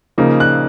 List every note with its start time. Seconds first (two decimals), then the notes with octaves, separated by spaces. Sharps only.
0.18 C#3 F3 A#3 D#4
0.40 F#6